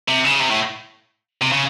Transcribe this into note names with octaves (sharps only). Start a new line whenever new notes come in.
C3
C#3
C3
A2
C3
C#3